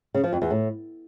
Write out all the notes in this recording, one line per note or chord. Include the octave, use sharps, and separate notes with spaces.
C#3
F3
F2
E2
A2